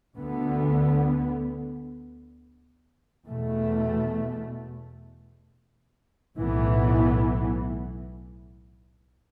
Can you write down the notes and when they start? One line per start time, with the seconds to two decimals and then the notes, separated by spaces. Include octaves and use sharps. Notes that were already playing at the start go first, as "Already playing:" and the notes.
0.16 D2 D3 B3
3.26 E2 B2 A3
6.36 B1 A2 E3 B3